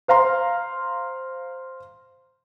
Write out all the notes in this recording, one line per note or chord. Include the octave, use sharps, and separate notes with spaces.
C5 F5 A#5 C6